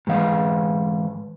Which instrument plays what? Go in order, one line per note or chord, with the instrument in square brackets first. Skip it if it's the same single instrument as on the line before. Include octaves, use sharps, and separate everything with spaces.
[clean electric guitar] G#2 E3 F5